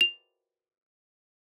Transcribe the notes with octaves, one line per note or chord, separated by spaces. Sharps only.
F7